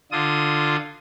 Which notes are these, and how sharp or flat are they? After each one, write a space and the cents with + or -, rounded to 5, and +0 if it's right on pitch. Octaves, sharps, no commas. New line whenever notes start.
D3 +15 F4 +0 D#6 +20